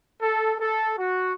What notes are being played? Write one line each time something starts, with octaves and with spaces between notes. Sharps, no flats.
A4
A4
F#4